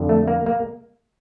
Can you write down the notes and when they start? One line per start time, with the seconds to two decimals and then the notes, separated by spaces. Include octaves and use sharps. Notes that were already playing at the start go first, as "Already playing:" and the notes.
Already playing: F2 D3
0.09 A3
0.28 A#3
0.46 A#3